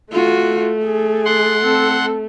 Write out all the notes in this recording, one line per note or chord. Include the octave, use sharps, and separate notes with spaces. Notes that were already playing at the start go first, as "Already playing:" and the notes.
A3 F4 F#4
G#4
F#5 C6
C4 A4